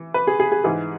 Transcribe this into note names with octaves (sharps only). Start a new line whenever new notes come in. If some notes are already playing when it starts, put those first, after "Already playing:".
Already playing: E3
B4
G#4
G#4
G#4
G#2 E3 G#4